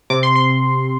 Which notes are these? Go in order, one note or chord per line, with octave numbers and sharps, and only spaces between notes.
C3 D6
C6
C6